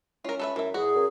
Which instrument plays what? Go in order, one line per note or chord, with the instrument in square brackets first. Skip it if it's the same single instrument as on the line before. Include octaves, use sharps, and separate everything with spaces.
[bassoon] C#4 [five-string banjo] F4 A#4
[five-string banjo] A4 B4 E5
[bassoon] F#2 [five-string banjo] E3 E5
[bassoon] E2 [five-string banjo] F#4 [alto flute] G#4
[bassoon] F#2